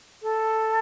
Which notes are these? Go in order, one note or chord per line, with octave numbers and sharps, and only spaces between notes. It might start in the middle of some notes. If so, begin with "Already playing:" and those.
A4